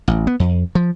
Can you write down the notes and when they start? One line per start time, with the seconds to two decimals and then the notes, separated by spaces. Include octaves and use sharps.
0.08 A1
0.27 B3
0.40 F2
0.75 F3